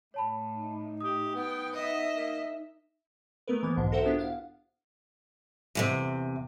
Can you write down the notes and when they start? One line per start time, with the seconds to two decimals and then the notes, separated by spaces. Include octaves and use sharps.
0.14 A2 C#5 A5 B5
0.56 D#4
1.00 G4 D#6
1.35 B3 G5
1.74 D#4 D#5 E5
2.15 A#3
3.48 A3 B3 A#4 B4
3.62 F2 E3 A#3 B3
3.77 B1 G#2 D3
3.92 F#4 A4 A#4 C5 E5 F#5
4.05 B3 D4 E4 F4 G4
4.19 F5 F#5
5.75 E2 A2 C3